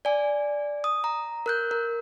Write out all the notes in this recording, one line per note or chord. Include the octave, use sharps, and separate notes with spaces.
D5 G#5
D#6
A#5
A#4 F#6 G6
A#4